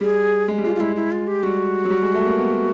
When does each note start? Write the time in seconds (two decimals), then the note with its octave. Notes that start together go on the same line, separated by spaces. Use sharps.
0.01 G3 G#4
0.48 G#3
0.58 G3
0.64 G#3 F4
0.76 F4
0.80 G#3 E4
0.96 E4
1.12 F4
1.27 G4
1.43 G3 F#4
1.85 F#3
1.90 G3
2.02 G#3
2.14 A3
2.26 A#3
2.38 B3